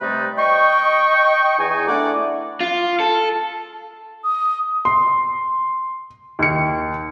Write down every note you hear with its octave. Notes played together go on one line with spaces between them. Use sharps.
C3 G3 A3 D#4 B4 D5
D#5 G5 C#6
E2 D#4 G#5
A3 D4 E4 D5 F#5 D6
F4
A4
D#6
C6
D#2 C#7